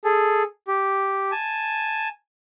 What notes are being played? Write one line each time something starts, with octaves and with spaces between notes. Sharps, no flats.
G#4 A4
G4
G#5 A5